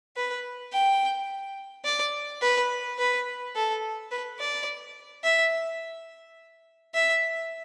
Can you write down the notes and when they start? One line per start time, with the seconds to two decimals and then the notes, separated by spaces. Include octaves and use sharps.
0.16 B4
0.73 G5
1.85 D5
2.42 B4
2.98 B4
3.55 A4
4.11 B4
4.39 D5
5.24 E5
6.94 E5